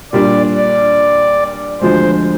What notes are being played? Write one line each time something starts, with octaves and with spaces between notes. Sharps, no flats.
A#2 G3 D4 D5
D5
D2 D3 F3 G#3 C5